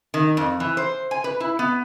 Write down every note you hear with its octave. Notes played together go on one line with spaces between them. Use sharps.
D#3
F2
E3
C5
G#5
B4
E4
B3